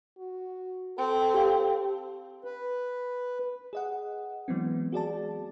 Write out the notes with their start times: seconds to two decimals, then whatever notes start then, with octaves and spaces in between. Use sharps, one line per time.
0.18 F#4
0.98 C4 A4
1.34 G4 F5
2.44 B4
3.73 G#4 D#5 F#5
4.48 E3 F#3 G#3 B3 C4
4.92 F#4 G#4 D5 A5